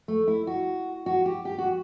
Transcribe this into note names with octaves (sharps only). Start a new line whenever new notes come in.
A3
E4
F#4
F#4
G4
G4
F#4